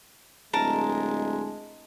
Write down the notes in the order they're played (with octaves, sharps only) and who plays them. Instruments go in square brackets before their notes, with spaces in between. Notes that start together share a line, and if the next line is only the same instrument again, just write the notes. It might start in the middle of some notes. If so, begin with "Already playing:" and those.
[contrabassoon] D1 [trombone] G#3 [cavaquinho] A#4 A5